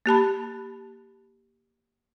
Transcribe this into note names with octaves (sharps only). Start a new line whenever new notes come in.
A#3 G4 A5 B5